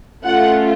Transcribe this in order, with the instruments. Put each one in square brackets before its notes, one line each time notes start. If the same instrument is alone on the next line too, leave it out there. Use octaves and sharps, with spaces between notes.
[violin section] A3 C#4 F4 F#5